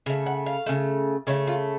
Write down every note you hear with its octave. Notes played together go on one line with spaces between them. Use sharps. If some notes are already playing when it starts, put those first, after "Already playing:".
C#3 A3 F5
F#5
F5
C#3 A3
C#3 A3 C#5
F4